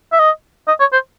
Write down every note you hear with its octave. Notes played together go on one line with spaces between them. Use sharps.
E5
D#5
D#5
C#5
C5